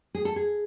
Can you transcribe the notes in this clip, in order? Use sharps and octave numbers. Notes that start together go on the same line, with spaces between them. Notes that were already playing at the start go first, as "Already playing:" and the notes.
G#4
A4
G#4